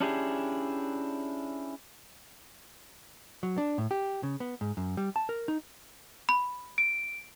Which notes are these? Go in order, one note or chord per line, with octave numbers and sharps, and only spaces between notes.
C#4 D4 E4 G4 G#4
F#3
D4
A2
G4
C#3
B3
G#2
F#2
G3
A5
A#4
D#4
B5
D7